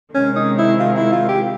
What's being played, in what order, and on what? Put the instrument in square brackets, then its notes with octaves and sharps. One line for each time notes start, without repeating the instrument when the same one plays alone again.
[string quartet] C3 D#3 G#3 [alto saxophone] C#4
[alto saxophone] D#4
E4
F4
E4
F4
G4